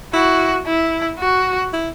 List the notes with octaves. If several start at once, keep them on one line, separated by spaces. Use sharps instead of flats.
E4 F#4
E4
F#4
E4